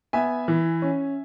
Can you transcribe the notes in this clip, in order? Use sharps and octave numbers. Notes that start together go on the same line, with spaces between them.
B3 E5 G#5
E3
C#4